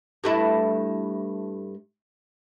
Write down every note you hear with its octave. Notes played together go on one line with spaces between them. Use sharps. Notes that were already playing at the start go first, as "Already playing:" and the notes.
G2 A3 E4